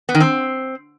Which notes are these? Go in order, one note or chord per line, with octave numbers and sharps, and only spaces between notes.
B3
D#3
C4